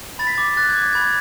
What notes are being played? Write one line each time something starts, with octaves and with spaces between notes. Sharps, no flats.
B5 A6
B6
D6 A6
F#6 A6
G#6
D6
B5 G#6